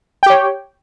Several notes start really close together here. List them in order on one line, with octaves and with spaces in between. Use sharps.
G5 G4 C#5